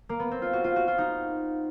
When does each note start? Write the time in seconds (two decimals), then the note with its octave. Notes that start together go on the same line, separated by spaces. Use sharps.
0.09 A#3
0.20 B3
0.31 C4
0.42 F4
0.53 F#4
0.64 F4
0.76 F#4
0.88 F4
0.98 D#4